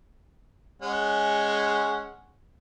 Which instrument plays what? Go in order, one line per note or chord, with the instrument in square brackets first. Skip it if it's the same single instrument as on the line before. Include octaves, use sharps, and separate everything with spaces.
[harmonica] G#3 C#4 F#5